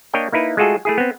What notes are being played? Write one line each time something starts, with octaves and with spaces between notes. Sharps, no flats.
A#3 D4 C#5 D#5 G5
A#3 D#4 E4 B4
G#3 A3 F4 F#4 G#4 A4
A3 E4 G#4
B3 C4